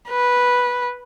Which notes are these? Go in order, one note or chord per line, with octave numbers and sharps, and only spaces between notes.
B4